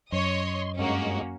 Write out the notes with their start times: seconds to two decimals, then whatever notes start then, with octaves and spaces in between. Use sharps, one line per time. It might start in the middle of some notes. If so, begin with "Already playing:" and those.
0.12 F#2 C#5 D#5 C6
0.79 G2 G#3 A#3 C#4 F#4